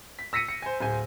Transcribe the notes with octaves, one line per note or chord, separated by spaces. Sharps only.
B6
E6 A#6 B6 C#7 D#7
C#7
C5 G#5
D1 C5 G#5